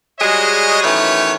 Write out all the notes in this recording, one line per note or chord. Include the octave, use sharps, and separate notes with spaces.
G3 G#3 F#4 G#4 C#5 D#5
F#2 D#3 E3 A3 B4 C#5